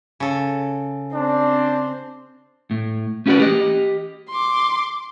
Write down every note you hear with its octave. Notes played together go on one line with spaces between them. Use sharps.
C#3 A4
C4 D4
A2
A3 C#4 E4 F#4 B4 D5
G4 D#5
C6 D6